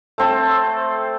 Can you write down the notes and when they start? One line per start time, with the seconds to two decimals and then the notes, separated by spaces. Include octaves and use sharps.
0.18 A3 C4 A4